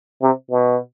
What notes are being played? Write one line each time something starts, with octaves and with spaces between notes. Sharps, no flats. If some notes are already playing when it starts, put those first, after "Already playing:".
C3
B2